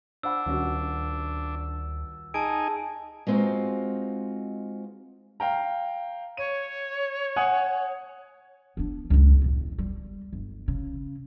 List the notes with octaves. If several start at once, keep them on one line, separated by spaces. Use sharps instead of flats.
D4 C5 F#5 B5 E6
D#1 D2 C#4 F#4
D#4 G#4 G#5 A5 D7
G#3 B3 C4 D#4 F4 F#4
F5 G5 A#5
C#5 D#7
F#5 G#5 D#6
B3 D4
C#2 F#2
E2 A2
G3
G1
C#3